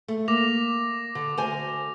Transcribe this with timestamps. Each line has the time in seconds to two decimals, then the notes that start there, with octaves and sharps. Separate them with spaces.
0.08 A3
0.28 A#3 D6 A#6 F7
1.15 D3
1.37 D2 C5 G#5